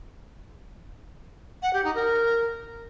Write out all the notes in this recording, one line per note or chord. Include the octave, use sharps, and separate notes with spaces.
F#5
G4
D#4
A#4